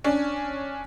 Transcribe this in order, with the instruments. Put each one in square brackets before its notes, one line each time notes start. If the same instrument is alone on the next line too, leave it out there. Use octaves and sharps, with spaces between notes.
[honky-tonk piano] C#4 D4